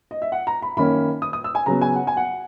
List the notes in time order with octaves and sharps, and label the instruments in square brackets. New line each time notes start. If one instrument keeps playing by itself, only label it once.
[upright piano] D#5
E5
F#5
A#5
B5
F#2 D#3 A#3 C#4 B5
D#6
D#6
E6
G#5
C#3 F#3 B3 A#5
G#5
F#5
G#5
F#5